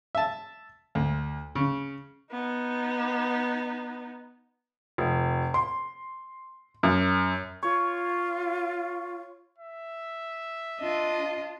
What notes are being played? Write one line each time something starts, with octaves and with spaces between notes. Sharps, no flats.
E5 A5
D2
C#3
B3 D#4
F1
C6
F#2
F4 C#5
E5
D4 F4 D#5